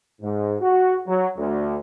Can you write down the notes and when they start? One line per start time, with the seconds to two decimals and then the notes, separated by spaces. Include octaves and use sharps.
0.21 G#2
0.61 F#4
1.07 F#3
1.37 D2